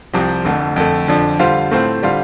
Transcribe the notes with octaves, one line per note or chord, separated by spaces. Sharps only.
C2 C3 F3 C4 G4
F1 F2 D3 A3
F2 D3 A3
F2 D3 F3 D4
D3 G3 F4 C5 F5
A2 A3 C4 F4 C5
D3 G3 F4 C5 F5